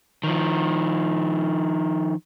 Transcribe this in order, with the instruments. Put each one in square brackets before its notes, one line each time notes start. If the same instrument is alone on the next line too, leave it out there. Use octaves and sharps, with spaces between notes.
[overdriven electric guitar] D#3 F3